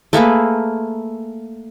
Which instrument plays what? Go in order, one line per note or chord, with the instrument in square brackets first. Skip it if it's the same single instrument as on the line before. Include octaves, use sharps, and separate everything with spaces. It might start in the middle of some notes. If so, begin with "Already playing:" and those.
[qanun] A3 A#3 G#4 B4